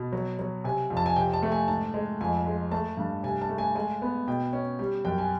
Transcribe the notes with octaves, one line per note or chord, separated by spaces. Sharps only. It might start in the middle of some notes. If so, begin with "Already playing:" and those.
Already playing: B2
F#3
F#3
C3 G#5
F2
A5
G#5
C3 G5
A5
A3
G#5
G#2 A5
G#3
F2 G#5
G#3
A3 A5
G2
C3 G#5
A5
A3
G#5
G#3 G#5
B3
B2 G5
C#4
G3
F#2 G5
G#5